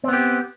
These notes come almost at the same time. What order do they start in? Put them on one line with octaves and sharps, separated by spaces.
C4 B3 G4